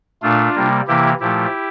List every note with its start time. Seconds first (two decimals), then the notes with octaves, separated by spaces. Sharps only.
0.22 A#2 A3 D4 F4
0.55 C3 G3 A#3
0.87 C3 E3 A#3 E4 G4
1.20 A#2 F3 A3 E4 G4